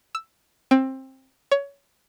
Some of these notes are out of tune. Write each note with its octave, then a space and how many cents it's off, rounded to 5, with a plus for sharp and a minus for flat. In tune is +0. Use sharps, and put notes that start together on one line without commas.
E6 +5
C4 +20
C#5 +20